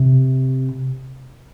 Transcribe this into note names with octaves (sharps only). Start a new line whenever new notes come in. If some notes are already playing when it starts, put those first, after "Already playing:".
Already playing: C3